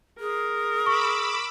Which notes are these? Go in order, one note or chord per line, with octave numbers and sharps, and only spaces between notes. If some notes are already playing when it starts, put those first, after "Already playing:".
G#4 A#4
B5 C#6 D6 E6